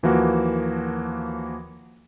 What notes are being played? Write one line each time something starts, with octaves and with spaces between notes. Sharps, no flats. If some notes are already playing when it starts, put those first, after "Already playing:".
D#2 E3 F3 A#3 F#4